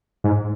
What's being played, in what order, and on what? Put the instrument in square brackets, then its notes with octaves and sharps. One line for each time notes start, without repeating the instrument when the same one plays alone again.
[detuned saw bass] G#2